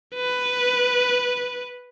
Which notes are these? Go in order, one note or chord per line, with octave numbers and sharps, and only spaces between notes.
B4